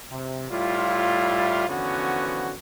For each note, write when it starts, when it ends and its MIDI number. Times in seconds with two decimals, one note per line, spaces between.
0.10 0.47 48
0.50 1.67 45
0.50 1.67 55
0.50 1.67 64
0.50 1.67 65
1.68 2.53 40
1.68 2.53 50
1.68 2.53 53
1.68 2.53 59
1.68 2.53 61
1.68 2.53 66